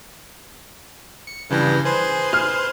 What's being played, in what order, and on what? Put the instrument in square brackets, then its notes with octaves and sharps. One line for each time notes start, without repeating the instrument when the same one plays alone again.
[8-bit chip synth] C#7
[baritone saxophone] G2 [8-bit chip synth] C#3 E3 A#6
[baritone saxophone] G#4 [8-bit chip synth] B4 C5 C6
[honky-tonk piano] F6